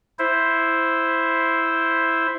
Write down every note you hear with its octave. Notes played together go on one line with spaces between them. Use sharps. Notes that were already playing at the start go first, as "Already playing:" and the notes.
E4 C5